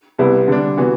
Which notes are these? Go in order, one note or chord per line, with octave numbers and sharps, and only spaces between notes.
C2 C3 G3 B3 E4
D3 G3 D4
C3 E3 B3 F#4